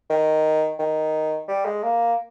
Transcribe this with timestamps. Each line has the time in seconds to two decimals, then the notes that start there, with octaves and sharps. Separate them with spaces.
0.10 D#3
0.79 D#3
1.48 G3
1.65 G#3
1.83 A#3